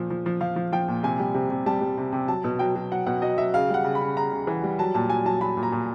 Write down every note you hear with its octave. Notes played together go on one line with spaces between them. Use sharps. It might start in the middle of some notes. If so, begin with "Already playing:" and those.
Already playing: A#2 F3
F3
F3
F3 F5
F3
F3 G5
A#2
C3 G#5
G3
C3
C3
G3 A5
G3
C3
C3
F#3 A5
B2
F#3 G5
F#3
F#3 F#5
B2 F#5
F#3 D#5
F#3 E5
C#3 F5
G3 F#5
C#3
B5
C#3
C#3 A#5
C#3
E3
G3
F#3 A5
A#2 A5
F#3 G#5
F#3 A5
F#3 B5
A#2
A#5
A#2